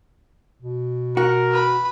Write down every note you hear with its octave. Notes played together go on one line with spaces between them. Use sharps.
B2
F#4 A#4
B4 B5